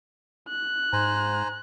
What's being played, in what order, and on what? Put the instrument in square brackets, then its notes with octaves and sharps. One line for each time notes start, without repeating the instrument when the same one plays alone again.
[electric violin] F#6
[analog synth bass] G#2 [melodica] C5 G#5 A#5